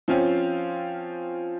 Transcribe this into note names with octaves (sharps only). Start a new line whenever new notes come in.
F3 C4 C#4 F4